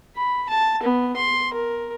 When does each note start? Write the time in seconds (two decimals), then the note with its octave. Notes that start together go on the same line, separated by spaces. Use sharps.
0.16 B5
0.49 A5
0.83 B3
1.16 C6
1.53 A#4